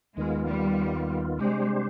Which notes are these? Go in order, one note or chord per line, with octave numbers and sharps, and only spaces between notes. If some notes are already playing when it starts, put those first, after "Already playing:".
D#2 D#3 G#3 B3 F4
G3
C3 G3 G#3 D4 G4 C5